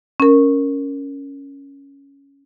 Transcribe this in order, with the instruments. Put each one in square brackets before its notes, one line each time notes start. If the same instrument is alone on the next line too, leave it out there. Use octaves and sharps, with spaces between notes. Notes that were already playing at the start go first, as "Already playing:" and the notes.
[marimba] C#4 A#4